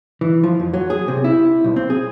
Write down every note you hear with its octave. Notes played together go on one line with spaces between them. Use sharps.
E3
F3
F2
F#3
G#4
C3
E4
B1
C4
G#4